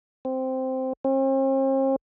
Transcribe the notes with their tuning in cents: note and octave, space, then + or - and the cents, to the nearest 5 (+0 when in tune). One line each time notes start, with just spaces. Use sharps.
C4 -5
C4 +45